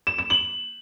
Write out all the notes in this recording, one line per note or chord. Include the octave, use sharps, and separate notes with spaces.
E7
E7
F#7